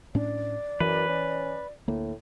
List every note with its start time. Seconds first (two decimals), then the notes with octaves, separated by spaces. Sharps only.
0.15 A2 C#4 D4 D5
0.80 F#2 E3 B4
1.08 C#4
1.88 D2 A2 A#3